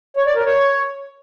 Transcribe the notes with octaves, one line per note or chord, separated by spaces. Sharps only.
C#5
D5
A#4
C#5